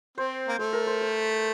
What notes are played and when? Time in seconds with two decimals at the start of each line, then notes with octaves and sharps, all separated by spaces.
0.18 C4 C5
0.48 A#3
0.59 A3 C5
0.73 A#4
0.87 C5
1.01 C5